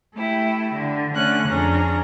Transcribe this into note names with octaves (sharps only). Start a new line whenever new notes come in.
A3 E4 G4
D3
D3 A3 C#4 F#6
F2 C#4 D4 G#4 A#5